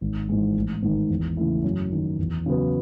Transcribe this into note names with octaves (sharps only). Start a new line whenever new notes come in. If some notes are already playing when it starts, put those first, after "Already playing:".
G#1
G#2 E3 G#3
A1
G#2 D#3
E2
C#3 E3 A3 E4
F#2
D#3 F#3
E2
C#3 F#3 B3